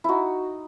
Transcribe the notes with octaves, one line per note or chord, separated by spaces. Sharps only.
D#4 E4 F#4